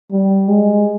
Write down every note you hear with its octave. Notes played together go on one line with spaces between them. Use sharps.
G3
G#3